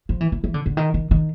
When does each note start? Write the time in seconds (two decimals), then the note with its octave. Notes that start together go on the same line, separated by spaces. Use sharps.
0.09 F3
0.21 E3
0.32 E3
0.44 E3
0.54 D3
0.66 D3
0.77 D#3
0.94 D#3
1.11 D#3